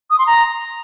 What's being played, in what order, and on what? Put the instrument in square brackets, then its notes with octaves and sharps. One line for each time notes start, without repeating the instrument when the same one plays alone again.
[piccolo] D#6
C6
A#5